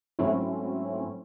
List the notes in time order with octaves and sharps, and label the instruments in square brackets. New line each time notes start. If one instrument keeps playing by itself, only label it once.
[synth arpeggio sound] G#2 F#3 A3 C4 C#4 E4